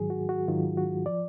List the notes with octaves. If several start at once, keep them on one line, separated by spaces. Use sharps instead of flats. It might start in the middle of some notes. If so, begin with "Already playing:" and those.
Already playing: G#2 D#3 F#3 G#4
F#4
F#4
G#2 D#3 F#3 F4
F#4
F3 D5